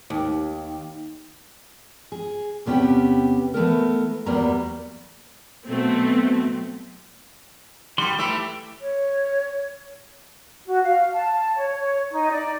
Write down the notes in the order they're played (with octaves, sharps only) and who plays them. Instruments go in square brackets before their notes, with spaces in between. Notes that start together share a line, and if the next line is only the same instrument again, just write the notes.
[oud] D#2
[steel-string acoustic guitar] G#4
E2 C3 B3 C#4 G4 G5
E3 A3 B3 A#4
E2 F#3 G3 A#3 B3 A#5
[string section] B2 F#3 A3 C4
[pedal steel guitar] D#3 F#4 C6 [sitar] G3
[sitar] E3 E5 [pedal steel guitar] A3 G4
[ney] C#5
[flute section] F#4
F5
A5
C#5
C#5
D#4
D5